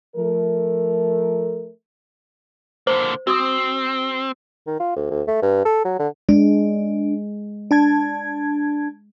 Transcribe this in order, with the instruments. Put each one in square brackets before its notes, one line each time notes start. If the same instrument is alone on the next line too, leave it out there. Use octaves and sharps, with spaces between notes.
[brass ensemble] F3 A3 A#4
[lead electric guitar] D3 A#3 [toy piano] C5
[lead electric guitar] C4 [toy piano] F#4 D6 D#6
[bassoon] D#3
F4
D2
D2
A3
G2
A4
F#3
D3
[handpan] G#3 [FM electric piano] D4
[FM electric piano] D4 A5 G#6